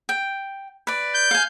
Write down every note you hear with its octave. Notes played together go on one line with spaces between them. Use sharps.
G5
B4 D5
G6
F5 G#5